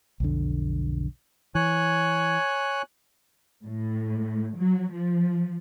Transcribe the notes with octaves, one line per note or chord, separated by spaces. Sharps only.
B1 F2 D3
E3 C#5 G#5 F#6
A2
F#3
F3